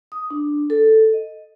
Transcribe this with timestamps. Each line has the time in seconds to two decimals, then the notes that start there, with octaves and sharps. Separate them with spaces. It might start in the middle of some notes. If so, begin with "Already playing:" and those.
0.12 D#6
0.31 D4
0.70 A4
1.13 D#5